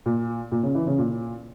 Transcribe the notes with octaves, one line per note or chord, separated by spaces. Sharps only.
A#2
A#2
C#3
E3
C#3
A#2